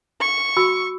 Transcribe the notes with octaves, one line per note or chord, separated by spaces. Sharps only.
C#6
F#4 B5 E6